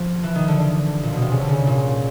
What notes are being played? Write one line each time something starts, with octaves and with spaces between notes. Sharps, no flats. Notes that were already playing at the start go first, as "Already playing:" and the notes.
Already playing: F3
E3
D#3
D3
D3
A#2
B2
C3
C#3
D3
C#3
A#2